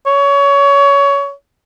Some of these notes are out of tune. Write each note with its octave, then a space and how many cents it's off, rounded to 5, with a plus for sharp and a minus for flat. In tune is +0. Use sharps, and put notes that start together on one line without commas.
C#5 +20